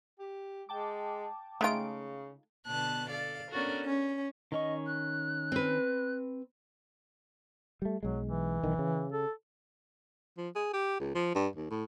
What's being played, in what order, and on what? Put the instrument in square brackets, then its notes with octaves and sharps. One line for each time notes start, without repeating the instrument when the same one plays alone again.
[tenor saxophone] G4
[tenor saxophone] G#3 [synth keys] G5 A5 D6
[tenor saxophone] C#3 [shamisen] G#3 D#4 F4 [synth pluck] A3 D7
[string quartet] B2 D3 B3 A5 F#6
A4 D5 F5
B3 C#4 D4 F#4 A4 A#4
C#4
[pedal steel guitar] D#3 C#4 C#6 [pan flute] D#5
[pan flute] F#6
[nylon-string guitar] C4 B4
[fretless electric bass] G3 A3
[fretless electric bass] B1 G#3 [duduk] F#3
[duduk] E3
[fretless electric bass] B1 D#3
C#3
[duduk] A4
[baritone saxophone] F3
G#4
G4
C#2
F3
G2
D#2
A2